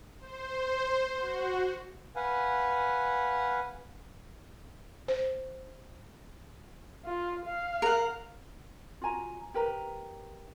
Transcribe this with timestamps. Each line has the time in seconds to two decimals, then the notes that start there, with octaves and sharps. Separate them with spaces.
0.19 C5
1.19 F#4
2.16 B4 F5 F#5 G#5
5.08 C5
7.05 F4
7.45 F5
7.82 A#4 F#5
9.01 F4 F#4 G#5 A#5
9.54 G4 A#4 B4 A#5